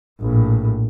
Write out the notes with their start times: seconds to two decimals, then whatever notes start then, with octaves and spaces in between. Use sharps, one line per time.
0.20 A#1 A2